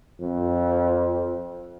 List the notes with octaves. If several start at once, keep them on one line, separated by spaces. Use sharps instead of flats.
F2